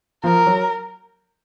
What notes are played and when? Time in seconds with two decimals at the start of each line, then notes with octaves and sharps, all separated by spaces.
0.24 F3 A#4
0.46 F#3